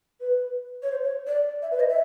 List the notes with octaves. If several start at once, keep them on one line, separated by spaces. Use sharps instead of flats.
B4
C#5
C5
C#5
D5
E5
B4
D#5
E5